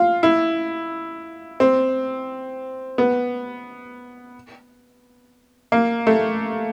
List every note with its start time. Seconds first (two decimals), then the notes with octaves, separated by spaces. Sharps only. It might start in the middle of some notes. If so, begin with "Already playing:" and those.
Already playing: F4
0.23 E4
1.60 C4
2.98 B3
5.72 A#3
6.07 A3